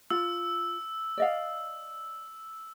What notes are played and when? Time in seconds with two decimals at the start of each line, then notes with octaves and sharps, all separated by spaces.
0.10 F4 E6
1.17 D5 D#5 F5